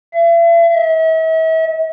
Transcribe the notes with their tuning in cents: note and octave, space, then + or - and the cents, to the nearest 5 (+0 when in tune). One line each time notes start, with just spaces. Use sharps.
E5 +45
E5 -40